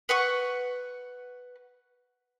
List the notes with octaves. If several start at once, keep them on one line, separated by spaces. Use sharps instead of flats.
B4 F#5 C#6